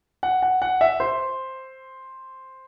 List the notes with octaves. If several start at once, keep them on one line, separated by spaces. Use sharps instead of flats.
F#5
F#5
F#5
E5
C5